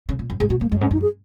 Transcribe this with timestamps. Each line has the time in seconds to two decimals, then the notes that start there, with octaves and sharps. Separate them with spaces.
0.09 C#3
0.19 A#2
0.30 F#2
0.40 G#2 G#4
0.50 A#2 F#4
0.61 G#2 A#3
0.71 F#2 G#3
0.81 G#2 C#4
0.91 F#2 D#4
1.02 G#4